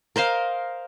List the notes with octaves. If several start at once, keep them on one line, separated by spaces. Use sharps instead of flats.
A#4 C5 D#5 F5